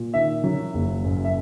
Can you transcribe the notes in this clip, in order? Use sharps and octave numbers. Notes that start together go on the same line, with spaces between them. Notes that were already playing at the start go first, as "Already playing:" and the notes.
Already playing: A#2
D#3 E5
F#3
F#1
F#2
E5